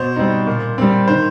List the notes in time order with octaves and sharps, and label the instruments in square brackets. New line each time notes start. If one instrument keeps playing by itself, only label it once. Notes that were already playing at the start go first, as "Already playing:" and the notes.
Already playing: [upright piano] B2 C5
G3 C4 D#4
A#2
G3 C4
D#3 C5